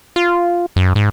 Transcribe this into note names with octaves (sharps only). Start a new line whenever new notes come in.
F4
F#2
G#2